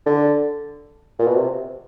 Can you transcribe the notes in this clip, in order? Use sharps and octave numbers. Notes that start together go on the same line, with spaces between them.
D3
A#2
B2
C3